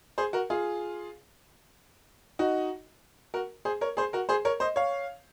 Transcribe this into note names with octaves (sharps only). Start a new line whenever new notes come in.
G#4 C5
F#4 A#4
F4 G#4
D#4 F#4
F#4 A#4
G#4 C5
A#4 C#5
G#4 C5
F#4 A#4
G#4 C5
A#4 C#5
C5 D#5
C#5 F5